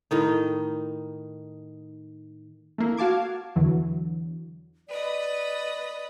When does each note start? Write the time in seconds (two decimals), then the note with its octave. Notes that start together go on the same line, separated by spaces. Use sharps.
0.11 A2 D#3 D#4
2.78 A3 A#3 E4
2.97 F#4 F5 A5 D6 G#6
3.56 E2 D3 E3 F#3
4.88 B4 D5 D#5